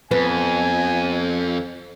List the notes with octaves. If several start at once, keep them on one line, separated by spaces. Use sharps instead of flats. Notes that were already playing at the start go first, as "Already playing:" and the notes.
F2 B3 G#5